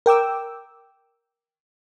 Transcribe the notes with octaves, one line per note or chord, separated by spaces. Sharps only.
A#4 G5 D6 E6